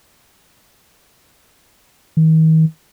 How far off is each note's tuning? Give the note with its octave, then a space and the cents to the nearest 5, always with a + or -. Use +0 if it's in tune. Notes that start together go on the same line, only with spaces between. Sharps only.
D#3 +40